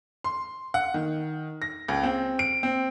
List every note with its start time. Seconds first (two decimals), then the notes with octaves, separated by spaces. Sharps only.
0.24 C6
0.74 F#5
0.94 D#3
1.62 A#6
1.88 C#2
2.03 C4
2.39 D7
2.63 C4